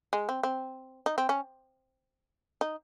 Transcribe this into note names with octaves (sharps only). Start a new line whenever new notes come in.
G#3
C4
C4
D#4
C4
C#4
D#4